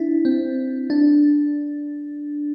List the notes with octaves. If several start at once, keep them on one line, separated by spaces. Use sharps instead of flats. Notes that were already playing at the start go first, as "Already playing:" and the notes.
Already playing: D4 E4
C4
D4